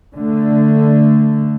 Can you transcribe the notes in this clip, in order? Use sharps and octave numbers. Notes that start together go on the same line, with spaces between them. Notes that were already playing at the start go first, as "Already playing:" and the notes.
D3 A3